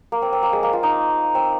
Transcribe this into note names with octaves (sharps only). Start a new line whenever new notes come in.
A#3
C4
C4
A#3
G#3
A#3
F4
D#4
C4